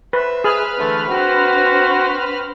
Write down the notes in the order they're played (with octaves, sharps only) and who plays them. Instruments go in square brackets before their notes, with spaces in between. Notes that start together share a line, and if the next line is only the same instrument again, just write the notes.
[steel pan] B4 [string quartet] C5 E5
[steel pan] G#4 [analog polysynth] B4 B5 F6
[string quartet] D3 E3 A3
[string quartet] C4 D4 C5 [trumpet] F#4